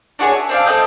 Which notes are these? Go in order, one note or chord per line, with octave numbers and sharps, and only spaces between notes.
D4 F#4 G#4 C#5
E5
C4 D4 F5
A3 C4 D#5 G6